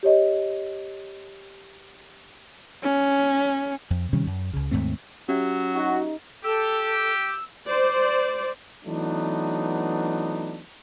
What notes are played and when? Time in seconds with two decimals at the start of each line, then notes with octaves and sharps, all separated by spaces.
0.03 G4 C#5 D#5
2.83 C#4
3.90 F2
4.13 C3 D#3 G3 C#4
4.27 F#2
4.53 C#2 C#3
4.71 D#2 G#2 A3 C4
5.29 F#3 C#4 G4 E5
5.75 D#4 F#4
6.44 G4 A4 E6
7.68 C5 D5
8.85 E3 F#3 A3 B3 D4 D#4